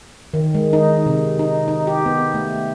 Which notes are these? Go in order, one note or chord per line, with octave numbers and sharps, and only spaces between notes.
D#3
G#3
D#4
C3
D#4
D#4
G4
B3
A3